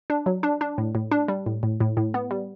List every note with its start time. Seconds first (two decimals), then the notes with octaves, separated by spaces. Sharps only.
0.10 D4
0.26 F#3
0.43 D4
0.61 D4
0.78 A2
0.95 A2
1.11 D4
1.28 G3
1.46 A2
1.63 A2
1.80 A2
1.97 A2
2.14 B3
2.31 G3